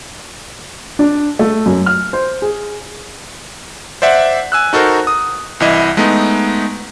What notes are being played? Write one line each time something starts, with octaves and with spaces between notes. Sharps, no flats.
D4
A3
F#2
F6
C5
G#4
C5 D5 E5 F#5
G#5 E6 F#6
D#4 F#4 A4 A#4 C5
D#6
C2 E3 E4 D#5
G#3 A3 B3 D#4